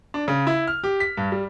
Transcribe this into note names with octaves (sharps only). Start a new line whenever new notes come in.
D4
C#3
E4
F6
G4
B6
G2
G3